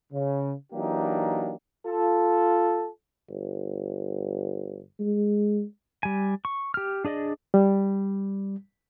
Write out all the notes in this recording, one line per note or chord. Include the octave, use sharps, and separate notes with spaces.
C#3
E3 F#3 A#3 D4 D#4 G4
F4 A4
G1
G#3
G3 G#5
C#6
G4 F6
D4 G#4 D5 D#5
G3